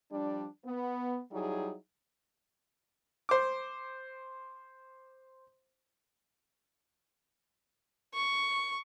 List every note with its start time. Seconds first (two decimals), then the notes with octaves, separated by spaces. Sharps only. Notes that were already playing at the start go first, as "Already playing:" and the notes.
0.12 F3 G3 D4
0.65 B3
1.32 F#3 G3 D#4 E4 G#4
3.29 C5 D6
8.14 C#6